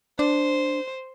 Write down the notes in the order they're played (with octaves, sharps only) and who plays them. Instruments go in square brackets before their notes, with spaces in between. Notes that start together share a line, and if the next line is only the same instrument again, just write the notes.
[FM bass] D4 [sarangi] C5